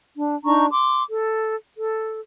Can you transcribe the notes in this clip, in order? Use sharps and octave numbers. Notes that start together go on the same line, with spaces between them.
D4
D4 D#4 A#5 C#6
C6 D6
A4
A4